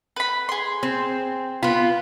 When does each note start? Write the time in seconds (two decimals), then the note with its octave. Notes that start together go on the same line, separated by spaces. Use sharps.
0.16 B4 B5
0.49 G#4 C6
0.83 C4
1.63 B3 F4 B5